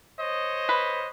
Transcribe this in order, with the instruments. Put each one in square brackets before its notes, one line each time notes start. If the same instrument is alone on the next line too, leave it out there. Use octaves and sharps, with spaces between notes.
[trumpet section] C5 C#5 D#5
[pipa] B4